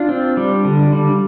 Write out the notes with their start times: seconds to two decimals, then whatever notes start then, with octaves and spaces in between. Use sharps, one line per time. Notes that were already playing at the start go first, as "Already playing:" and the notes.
Already playing: D4 F4
0.09 C4
0.37 G3
0.65 D3
0.92 G3